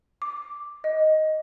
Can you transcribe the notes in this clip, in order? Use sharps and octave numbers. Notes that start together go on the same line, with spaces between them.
D6
D#5